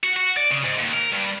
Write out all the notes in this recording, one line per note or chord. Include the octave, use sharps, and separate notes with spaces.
F#4
F#4
D5
C#3
G#2
D#2
A#4
G2